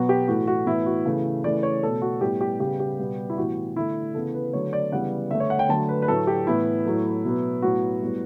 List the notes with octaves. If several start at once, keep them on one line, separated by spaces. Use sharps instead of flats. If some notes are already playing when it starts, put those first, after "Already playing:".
Already playing: B2 F#3 B3 F#4
G4
A2 E3 A3 F#4
F#4
A2 E3 B3 E4
F#4
C#3 E3 A3
C#3 E3 A3 D5
C#5
B2 A3 A4
F#4
A2 G3 B3 G4
G4
C#3 G3 B3 G4
G4
B2 G3 B3
E4
A2 E3 B3 F#4
D3 A3 E4
C#3 E3 B3 A4
B4
D3 F#3 A3 C#5
D5
C#3 E3 G3 B3 F#5
D3 A3 E5
C#5
F#5
G5
D3 F#3 A3 A5
B4
B4
A2 F#3 A3 A4
G4
A2 E3 B3 E4
A2 F#3 A3
B2 F#3 B3
A2 F#3 B3 F#4
A2 G3 B3